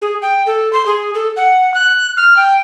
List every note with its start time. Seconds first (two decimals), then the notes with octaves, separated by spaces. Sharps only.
0.02 G#4
0.22 G5
0.46 A4
0.73 C6
0.86 G#4
1.14 A4
1.36 F#5
1.74 F#6
2.17 F6
2.37 G5